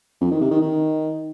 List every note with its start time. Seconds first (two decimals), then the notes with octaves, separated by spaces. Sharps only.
0.21 F2
0.31 D#3
0.41 C3
0.51 D#3
0.61 D#3